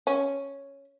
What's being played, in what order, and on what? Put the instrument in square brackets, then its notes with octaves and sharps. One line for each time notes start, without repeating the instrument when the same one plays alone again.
[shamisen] C#4